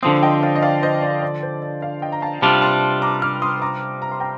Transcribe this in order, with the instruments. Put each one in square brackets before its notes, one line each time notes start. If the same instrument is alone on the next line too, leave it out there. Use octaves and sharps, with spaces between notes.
[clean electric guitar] D3 F3 C4 [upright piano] C6 D#6
[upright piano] D#5 G5
D5 F5
D#5
D5 F5
C5 D#5
D5
D5
C5
D5
D5 F5
D#5 G5
A#5
F5 A5
[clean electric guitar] C3 G3 D4 F4 [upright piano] A5 C6
[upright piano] A5 C6
A#5 D6
D6 F6
C6 D#6
A#5 D6
A#5
C6
G5 A#5